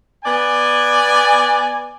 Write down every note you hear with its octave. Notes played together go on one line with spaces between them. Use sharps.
B3 D5 G#5